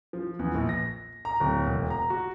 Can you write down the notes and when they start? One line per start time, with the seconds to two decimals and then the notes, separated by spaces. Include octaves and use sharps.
0.13 F3
0.39 E2
0.54 A#1
0.69 A#6
1.25 A#5
1.40 D1
1.67 E1
1.90 A#5
2.10 F#4